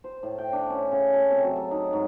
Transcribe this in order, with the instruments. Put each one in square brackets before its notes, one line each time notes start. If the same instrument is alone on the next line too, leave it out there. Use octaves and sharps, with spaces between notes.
[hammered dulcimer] C5
A2
G5
D4
C#4
C#3
A4
C3
F#3
A4
D#4
G#2